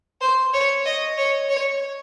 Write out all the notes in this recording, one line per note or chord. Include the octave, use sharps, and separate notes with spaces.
C5
C#5
D#5
C#5
C#5